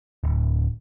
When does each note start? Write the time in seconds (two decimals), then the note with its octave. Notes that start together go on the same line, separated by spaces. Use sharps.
0.24 D1